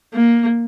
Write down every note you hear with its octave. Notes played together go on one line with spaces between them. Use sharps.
A#3